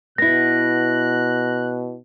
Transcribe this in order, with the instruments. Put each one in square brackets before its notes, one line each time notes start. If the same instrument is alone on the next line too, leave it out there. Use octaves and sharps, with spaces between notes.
[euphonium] B2 [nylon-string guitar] B3 E4 [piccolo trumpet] F#6 [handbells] A#6